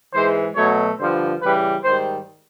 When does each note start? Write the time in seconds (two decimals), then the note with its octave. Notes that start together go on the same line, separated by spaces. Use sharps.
0.13 G#2 E3 G#3 C5
0.55 B2 F#3 A3 C#5
0.99 G2 D3 F3 C5
1.42 C#3 E3 G3 B4
1.84 G#2 D#3 G3 C5